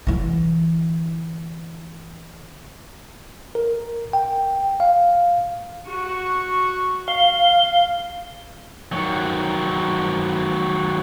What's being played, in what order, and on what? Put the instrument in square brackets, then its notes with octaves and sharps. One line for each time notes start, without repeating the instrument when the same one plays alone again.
[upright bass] D3 E3
[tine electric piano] A#4
G5
F5
[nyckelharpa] F#4 C#6
[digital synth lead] F5 [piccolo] G7
[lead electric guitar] D#3 F#3